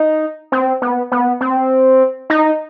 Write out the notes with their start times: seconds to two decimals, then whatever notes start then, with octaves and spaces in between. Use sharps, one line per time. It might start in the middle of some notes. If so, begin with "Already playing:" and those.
Already playing: D#4
0.52 C4
0.82 B3
1.12 B3
1.41 C4
2.30 D#4